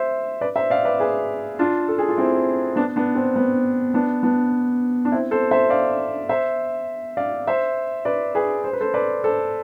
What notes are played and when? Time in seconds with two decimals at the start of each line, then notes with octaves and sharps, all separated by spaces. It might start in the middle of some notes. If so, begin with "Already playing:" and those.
Already playing: C5 E5
0.41 B4 D5
0.56 C5 E5
0.70 D5 F5
0.85 B4 D5
1.00 G#4 B4
1.59 D4 F4
1.88 A4
1.98 G#4
2.08 F4
2.18 C4 E4
2.76 B3 D4
2.96 B3 D4
3.15 C4
3.36 B3
3.94 B3 D4
4.23 B3 D4
5.05 D4
5.12 C4 E4
5.31 A4 C5
5.51 C5 E5
5.70 D5 F5
6.29 C5 E5
7.17 D5 F5
7.47 C5 E5
8.05 B4 D5
8.35 G#4 B4
8.64 C5
8.73 B4
8.80 A4 C5
8.94 B4 D5
9.24 A4 C5